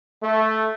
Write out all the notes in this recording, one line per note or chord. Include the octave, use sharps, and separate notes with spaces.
A3